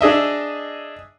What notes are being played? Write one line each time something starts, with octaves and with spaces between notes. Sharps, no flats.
D4 G#4 D#5 E5